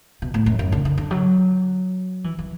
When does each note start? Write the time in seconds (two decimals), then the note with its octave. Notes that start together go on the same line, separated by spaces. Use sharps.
0.22 B2
0.34 A2
0.46 F#2
0.59 F#2
0.72 D3
0.85 D3
0.98 D3
1.11 F#3
2.24 E3
2.39 E3